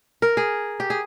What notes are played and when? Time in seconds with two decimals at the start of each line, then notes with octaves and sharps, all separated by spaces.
0.22 A#4
0.37 G#4
0.80 G4
0.90 G#4